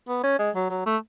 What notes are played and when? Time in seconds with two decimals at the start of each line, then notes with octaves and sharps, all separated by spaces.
0.08 B3
0.23 C#4
0.39 G#3
0.55 F#3
0.70 F#3
0.86 A3